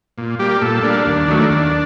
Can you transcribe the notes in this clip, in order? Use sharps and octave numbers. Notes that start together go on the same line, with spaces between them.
A#2
G3 A#3 G4
A#2 A4
G3 A#3 D4
D#2
D#3 F#3 A3
D#2